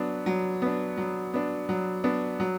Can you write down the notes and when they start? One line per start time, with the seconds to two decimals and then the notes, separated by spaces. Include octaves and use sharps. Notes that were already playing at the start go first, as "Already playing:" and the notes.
Already playing: F#3 B3 D4
0.26 F#3
0.62 B3 D4
0.97 F#3
1.34 B3 D4
1.69 F#3
2.04 B3 D4
2.40 F#3